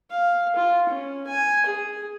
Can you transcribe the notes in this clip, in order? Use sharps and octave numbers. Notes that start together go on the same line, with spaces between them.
F5
F4
C#4
G#5
G#4